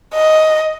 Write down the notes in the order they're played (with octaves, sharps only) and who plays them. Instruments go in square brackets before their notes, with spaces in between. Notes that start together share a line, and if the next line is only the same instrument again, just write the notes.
[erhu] D#5